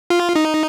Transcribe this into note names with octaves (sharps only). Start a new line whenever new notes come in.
F4
D#4